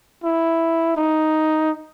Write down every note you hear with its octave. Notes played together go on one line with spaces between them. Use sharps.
E4
D#4